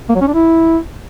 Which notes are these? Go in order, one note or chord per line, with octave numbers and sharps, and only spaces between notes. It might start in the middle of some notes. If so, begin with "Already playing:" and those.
A#3
F#3
C#4
D4
E4